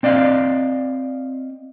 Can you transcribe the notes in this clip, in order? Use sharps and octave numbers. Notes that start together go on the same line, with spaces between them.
C4 D5 D#5 F5